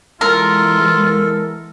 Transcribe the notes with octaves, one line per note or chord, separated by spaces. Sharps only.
E3 G#3 B3 F4 A4 A#4